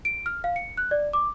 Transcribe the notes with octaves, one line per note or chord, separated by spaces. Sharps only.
D7
F6
F5
C#7
F#6
D5
D6